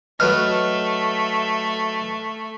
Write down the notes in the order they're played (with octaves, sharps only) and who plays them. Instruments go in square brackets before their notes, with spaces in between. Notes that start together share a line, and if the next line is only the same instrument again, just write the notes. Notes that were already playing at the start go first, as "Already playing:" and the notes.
[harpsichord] F#3 B4 D#5 [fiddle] A3 [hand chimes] F6